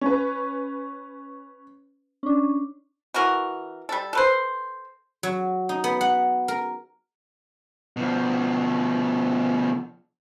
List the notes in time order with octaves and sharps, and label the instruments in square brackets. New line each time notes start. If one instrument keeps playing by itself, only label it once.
[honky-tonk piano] C#4 B4
[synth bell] C#4 D4
[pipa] E3 F#4 A#4
G3 A4
A4 B4 C5
[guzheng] F#3
D#4
B3
F#5
A#4
[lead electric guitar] B2 F3